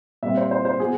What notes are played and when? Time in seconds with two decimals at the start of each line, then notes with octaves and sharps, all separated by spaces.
0.23 A#2 G3 C4 E5
0.37 C5
0.51 C5
0.65 C5
0.79 F#3 B3 G#4